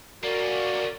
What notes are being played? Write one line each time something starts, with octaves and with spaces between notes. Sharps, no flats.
A#3 C#4 F#4 A#4 D5